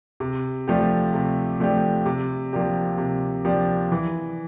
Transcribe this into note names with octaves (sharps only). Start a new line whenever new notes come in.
C3
F3 A3 D4 G4
C3
F3 A3 D4 G4
C3
F3 A#3 D4 G4
C3
F3 A#3 D4 G4
E3